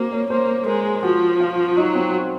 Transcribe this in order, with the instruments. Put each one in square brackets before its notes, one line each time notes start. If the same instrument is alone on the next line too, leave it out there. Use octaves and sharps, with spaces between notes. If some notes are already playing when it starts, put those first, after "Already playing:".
Already playing: [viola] A#3 [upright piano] C4 F#4 C5
[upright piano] C#5
[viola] A#3 [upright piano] C5
[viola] G#3 [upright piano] A#4
[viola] F3 [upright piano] F#4
[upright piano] F4
[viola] F#3 [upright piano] D#4
[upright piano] C4